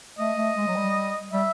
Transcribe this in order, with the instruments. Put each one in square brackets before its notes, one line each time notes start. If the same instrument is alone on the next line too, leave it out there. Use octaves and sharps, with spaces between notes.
[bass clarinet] A3 [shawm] D#5
[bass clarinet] A3
G#3
F#3
G3
[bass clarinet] G3 [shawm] E5